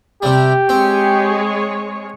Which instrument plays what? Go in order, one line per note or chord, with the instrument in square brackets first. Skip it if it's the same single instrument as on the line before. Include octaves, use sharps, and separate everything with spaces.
[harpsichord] C3 G3 [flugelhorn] G4
[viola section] G#3 G#4 C#5 [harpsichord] C4